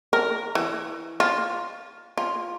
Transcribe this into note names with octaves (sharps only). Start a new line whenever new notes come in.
A#4
E3
F4
F4